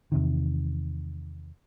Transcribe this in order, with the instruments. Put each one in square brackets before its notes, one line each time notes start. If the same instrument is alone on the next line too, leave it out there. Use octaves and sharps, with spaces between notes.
[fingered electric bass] E2 C3 D#3